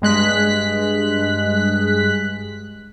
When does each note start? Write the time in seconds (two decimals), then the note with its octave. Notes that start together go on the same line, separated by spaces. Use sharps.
0.02 G2 G#3 F#6 B6